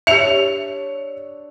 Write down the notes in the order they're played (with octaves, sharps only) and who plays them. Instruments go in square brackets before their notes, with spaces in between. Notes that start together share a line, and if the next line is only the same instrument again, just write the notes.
[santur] D4 C#5 E6 [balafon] G4 E5 [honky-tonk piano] C#7 F7